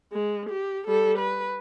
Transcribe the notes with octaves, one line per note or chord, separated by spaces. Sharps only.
G#3
G4
G3 A4
B4